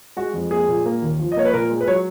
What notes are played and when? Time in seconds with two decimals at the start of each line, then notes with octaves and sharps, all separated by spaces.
0.17 G#3 F#4
0.34 F2
0.50 A#3 G#4
0.68 A#2
0.86 A#3
1.02 D#2
1.19 F3
1.32 D#5
1.37 A#3 C#5
1.45 B4
1.53 A#2 A#4
1.71 G#3
1.81 B4
1.88 F#3 C#5